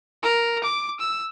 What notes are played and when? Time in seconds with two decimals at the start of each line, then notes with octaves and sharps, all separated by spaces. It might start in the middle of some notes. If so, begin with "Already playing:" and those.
0.23 A#4
0.64 D6
1.00 E6